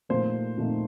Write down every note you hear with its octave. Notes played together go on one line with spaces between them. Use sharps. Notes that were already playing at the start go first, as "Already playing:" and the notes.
A#2 F3 A3 C4 D#4 C5
A#2 F3 A3 C4 D#4